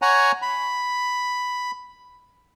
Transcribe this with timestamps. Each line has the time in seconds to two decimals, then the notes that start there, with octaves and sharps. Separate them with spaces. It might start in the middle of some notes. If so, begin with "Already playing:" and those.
0.02 C#5 F#5 G#5 A#5
0.42 B5